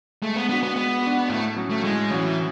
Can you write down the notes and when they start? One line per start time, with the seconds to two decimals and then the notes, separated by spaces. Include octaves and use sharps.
0.22 G#3 A3
0.36 B3
0.49 B3 D4 F#4
0.63 B3
0.76 G#3 B3
1.02 D4 F#4
1.29 A2 A3
1.56 F#3 C#4 F#4
1.70 A3
1.83 A2 G#3
2.11 E3 F#3 C#4 F#4